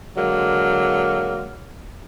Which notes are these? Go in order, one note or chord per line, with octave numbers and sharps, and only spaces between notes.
D3 F#3 G#3 A#3